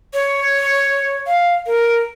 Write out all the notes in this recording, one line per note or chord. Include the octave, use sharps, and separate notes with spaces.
C#5
F5
A#4